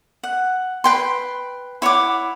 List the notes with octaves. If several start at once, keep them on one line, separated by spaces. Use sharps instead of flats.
F#5
B4 G5 C6
E4 C#5 F#5 D6